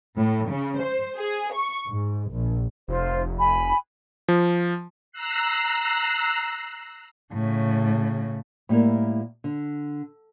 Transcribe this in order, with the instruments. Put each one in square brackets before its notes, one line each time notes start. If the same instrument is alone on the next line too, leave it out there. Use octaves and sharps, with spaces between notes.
[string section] A2
C#3
C5
G#4
C#6
G#2
A#1
[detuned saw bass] F1 [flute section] F4 C5
[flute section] G#5 B5
[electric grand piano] F3
[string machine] A#5 E6 F#6 C7
[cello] A2 C#3
[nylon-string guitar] A2 G3 A#3 E4 A#4
D3